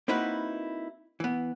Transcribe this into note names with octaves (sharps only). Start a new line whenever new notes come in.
A#3 C4 D#4 E4 F#4 B4
E3 B3